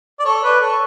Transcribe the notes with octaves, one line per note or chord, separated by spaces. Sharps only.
D5
A4 C#5
B4 D5
A4 C#5